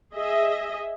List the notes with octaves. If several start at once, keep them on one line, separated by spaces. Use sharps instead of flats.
G#4 D#5 E5